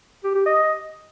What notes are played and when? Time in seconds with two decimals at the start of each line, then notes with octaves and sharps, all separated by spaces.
0.24 G4
0.35 G4
0.46 D#5